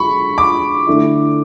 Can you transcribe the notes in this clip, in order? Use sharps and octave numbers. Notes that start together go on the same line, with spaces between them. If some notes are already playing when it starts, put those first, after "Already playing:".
Already playing: D3 G#3 B5 C#6
D6
D3 A3 E4